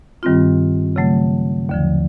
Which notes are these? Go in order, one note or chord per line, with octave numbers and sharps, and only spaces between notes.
G2 D#3 G3 C4 F4
C#3 F#3 A3
D#2 D3 F3